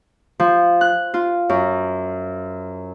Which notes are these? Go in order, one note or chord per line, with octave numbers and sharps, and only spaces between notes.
F3
F#6
F4
F#2